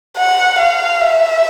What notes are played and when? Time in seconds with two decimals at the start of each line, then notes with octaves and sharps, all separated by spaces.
0.18 F#5
0.59 F5
1.01 E5